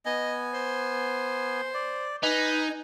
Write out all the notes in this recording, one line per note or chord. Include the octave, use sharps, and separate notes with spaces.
B3 D#5 G#5
C5
D5
D#4 B4 G#5